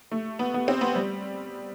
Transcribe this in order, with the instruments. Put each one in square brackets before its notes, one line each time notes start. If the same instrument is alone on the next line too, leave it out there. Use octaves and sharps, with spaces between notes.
[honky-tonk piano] A3
B3
B3
C4
B3
G3